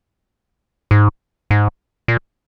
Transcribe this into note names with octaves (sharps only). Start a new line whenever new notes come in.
G#2
G#2
A#2